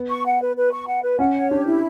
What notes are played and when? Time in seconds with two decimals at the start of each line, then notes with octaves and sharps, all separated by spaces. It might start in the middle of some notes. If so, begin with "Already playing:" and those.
Already playing: B3
0.10 C#6
0.26 F#5
0.41 B4
0.56 B4
0.72 C#6
0.87 F#5
1.03 B4
1.19 C#4 F#5
1.35 C#5
1.50 D4 G4
1.66 E4